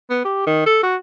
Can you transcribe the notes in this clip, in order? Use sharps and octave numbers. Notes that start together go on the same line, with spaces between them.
B3
G4
D#3
A4
F#4